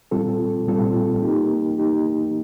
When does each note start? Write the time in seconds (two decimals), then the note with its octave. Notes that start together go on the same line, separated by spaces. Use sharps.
0.11 A#2 G3 C4 F4 A4
0.67 A#2 G3 C4 F4 A4
1.23 A#3 D#4 G4
1.78 A#3 D#4 G4